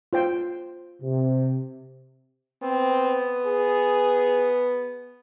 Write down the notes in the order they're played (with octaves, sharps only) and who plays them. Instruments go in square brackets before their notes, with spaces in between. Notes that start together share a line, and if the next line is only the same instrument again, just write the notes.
[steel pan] F4 C5 G5
[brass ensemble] C3
[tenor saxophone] B3 [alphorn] C4
[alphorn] G#4